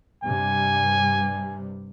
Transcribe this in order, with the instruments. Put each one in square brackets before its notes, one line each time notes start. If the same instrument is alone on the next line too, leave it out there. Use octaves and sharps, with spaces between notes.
[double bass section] G2 C3 G3 [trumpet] G#5